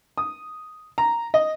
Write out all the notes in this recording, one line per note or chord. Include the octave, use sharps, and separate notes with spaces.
D#6
A#5
D#5